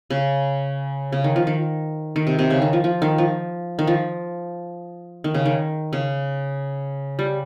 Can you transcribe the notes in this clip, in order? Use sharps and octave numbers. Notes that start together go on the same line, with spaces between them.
C#3
C#3
D#3
F3
D#3
D#3
C3
C3
C#3
D#3
F3
F3
D#3
F3
D#3
F3
D#3
C#3
D#3
C#3
G3